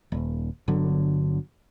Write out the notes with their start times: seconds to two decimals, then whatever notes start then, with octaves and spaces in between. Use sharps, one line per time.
0.12 D#1
0.68 G1 D3 F#3